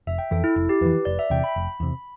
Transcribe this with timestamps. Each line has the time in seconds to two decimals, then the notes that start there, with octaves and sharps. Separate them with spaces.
0.07 F1 E5
0.18 G5
0.31 F2 E3 A4
0.44 E4
0.56 F1 E4
0.69 G4
0.81 F2 B4
0.86 E3
1.05 F1 D5
1.19 E5
1.30 E2 C3 G5
1.44 B5
1.56 F1
1.80 E2 C3